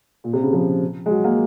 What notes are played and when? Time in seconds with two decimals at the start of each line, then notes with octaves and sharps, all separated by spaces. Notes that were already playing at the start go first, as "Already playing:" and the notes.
0.24 A#2
0.33 C3
0.43 C#3
0.53 F3
1.06 G#3
1.10 F#3
1.24 A#3